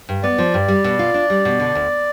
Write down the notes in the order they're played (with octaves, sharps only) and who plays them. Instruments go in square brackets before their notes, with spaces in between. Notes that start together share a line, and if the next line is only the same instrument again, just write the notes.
[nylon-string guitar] G2
[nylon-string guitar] B3 [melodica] D5
[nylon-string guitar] F3
G2
G3
B2
F4
D4
G3
B2
D3
D2